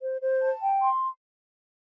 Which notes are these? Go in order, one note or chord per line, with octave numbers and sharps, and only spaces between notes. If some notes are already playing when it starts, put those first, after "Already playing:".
C5
C5
A5
G5
C6